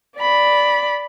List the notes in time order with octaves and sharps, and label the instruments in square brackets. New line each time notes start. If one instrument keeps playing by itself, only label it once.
[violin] D5 B5